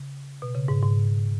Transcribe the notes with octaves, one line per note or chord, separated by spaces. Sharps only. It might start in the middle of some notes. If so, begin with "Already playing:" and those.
Already playing: C#3
B2
C#3
G#2
G#2